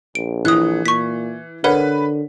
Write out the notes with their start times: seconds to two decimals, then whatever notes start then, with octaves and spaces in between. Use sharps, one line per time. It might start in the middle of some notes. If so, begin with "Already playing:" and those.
0.15 A#1 D7
0.45 E3 D#6 F#6
0.86 A#2 C#6 B6
1.64 D3 A#4 B4 C#5 F#5